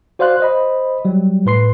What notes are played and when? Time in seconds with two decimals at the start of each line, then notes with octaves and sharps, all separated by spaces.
0.19 F#4 C5 D5 F5 C6 F#6
0.40 C5 D#5 B5
1.05 F#3 G3
1.46 A2 B4 C6 C7